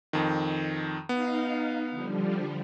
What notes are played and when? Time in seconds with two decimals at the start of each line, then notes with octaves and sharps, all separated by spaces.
0.13 F2 D#3
1.09 B3 D#4 F5
1.91 D3 F3 G3